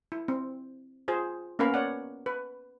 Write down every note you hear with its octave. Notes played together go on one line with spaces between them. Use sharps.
E4
C4
F4 G#4 C5
A#3 B3 C#4 A#4 F5 B5
C#5 D5 F#5
B4